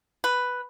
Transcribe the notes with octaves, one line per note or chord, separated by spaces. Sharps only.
B4